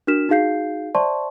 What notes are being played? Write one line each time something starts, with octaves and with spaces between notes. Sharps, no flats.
D4 F#4 A#4 F6 B6 E7
D#4 F#4 G#4 F5 G6 C7
C5 D5 E5 A5 C6 C#6